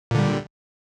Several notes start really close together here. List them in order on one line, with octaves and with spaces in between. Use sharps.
A#2 D3 G3